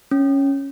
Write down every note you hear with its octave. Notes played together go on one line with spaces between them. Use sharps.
C#4